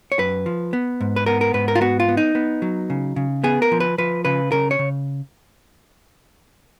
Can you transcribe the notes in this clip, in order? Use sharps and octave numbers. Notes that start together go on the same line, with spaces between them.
C#5
F#2 B4
F3
B3
G#2
B4
B3 A#4
A#4
G#2 B4
A#4
F4
B3 F#4
F4
B3
D#4
B3
F#3
C#3
C#3
B3 G#4
A#4
F3
B4
F3 B4
C#3 B4
C#3 A#4
C#5
C#3